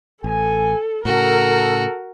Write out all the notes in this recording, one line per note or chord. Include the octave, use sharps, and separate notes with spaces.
A1 A4 G#5
A2 C#3 F#4 A4 A#4